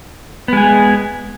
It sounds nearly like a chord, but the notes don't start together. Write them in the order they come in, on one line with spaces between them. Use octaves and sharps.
B3 G#3 G#4